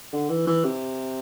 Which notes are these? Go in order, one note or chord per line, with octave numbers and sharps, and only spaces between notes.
D3
E3
E3
C3